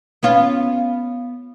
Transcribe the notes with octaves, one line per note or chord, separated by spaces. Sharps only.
B3 C#4 F4